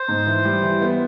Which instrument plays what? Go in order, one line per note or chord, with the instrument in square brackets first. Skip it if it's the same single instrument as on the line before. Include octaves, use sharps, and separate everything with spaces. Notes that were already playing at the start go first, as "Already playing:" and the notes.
Already playing: [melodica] C5
[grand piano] G#2
E3
G3
E3
B3